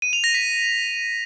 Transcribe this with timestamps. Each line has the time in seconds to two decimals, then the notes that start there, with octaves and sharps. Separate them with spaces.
0.02 D#7
0.13 F7
0.24 A#6
0.34 B6